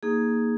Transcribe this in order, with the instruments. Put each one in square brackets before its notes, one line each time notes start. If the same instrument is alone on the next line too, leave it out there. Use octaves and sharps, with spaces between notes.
[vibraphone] A#3 D#4 G#4